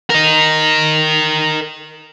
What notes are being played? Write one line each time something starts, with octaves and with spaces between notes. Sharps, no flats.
A#4 D#5